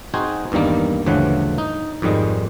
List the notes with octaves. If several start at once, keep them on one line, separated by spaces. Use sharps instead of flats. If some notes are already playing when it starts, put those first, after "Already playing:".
C4 D#4 F#4 G#4 C5 G#5
E2 G2 D#3 G3 A#3
D2 G2 C#3 E3 F3 F#5
D#4
F2 G#2 D#3 G3 G#3